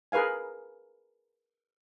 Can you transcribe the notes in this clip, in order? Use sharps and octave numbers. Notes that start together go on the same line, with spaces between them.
G#4 A#4 B4 F5 G#5